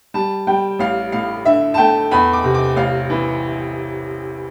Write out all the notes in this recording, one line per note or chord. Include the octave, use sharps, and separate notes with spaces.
G3 A5
G3 G5
A1 F5
A2 F5
D3 E5
A5
A3 G5
E2 B5
D6
C3
D6
A1 F5
E3